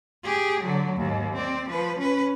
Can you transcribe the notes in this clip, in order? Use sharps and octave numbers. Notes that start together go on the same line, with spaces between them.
G4 G#4
D3 F#3
D#2 G#2
C4 D5
F3 B4
C#4 B4